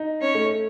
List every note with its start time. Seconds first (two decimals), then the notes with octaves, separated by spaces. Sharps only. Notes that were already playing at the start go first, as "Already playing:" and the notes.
Already playing: D#4
0.20 C#4 C#5
0.35 A3